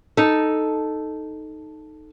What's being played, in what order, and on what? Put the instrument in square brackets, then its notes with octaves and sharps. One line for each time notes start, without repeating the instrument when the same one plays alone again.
[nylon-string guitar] D#4 A4